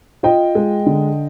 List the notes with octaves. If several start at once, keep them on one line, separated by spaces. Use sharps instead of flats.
F4 D#5 G5
G#3
D3